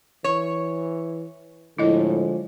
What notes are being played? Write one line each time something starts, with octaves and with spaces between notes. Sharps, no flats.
E3 C#5
A2 D3 F3 G#3 E4 D#5